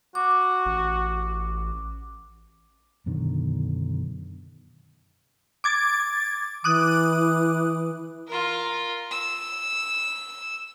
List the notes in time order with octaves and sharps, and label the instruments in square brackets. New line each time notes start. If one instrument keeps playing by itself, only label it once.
[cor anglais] F#4 [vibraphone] D6
[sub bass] A1
[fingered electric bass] F#2 B2 D3 D#3
[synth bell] D6 G#6 A6
[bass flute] E3 [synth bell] D6 D#6 F#6
[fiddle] F4 A#4
E6